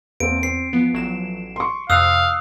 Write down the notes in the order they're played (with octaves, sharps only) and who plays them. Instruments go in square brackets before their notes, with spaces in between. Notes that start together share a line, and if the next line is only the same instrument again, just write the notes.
[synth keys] E2 [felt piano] A#3 C4 [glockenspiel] D7
[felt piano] C4 [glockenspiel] C7
[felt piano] F3 [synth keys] B3
[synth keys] A1 F#3 E7
[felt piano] C6 C#6
[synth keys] F2 C3 [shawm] F5 [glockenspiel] D#6 E6 [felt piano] F#6